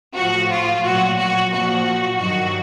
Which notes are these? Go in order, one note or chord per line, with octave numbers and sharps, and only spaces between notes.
A2 F3 F#4
F4
A#2 F#3 F#4
F#4
A#2 F3 F#4
G2 D#3 F#3 F#4